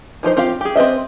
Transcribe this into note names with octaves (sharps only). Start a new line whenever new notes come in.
E3 F3 D#4 C5
C4 F4 G4 F5
G4 G#4
C4 B4 D#5 E5